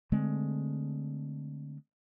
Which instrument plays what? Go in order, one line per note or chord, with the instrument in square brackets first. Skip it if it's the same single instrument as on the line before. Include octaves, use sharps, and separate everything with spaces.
[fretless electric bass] D3 G#3 A3 C4